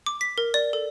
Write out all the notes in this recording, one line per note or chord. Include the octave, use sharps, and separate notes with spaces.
D6
B6
A#4
D5
A4